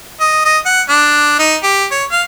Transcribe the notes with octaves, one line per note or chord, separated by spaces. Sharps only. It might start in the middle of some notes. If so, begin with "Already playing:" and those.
D#5
D#5
F#5
D4
D#4
G4
C#5
F5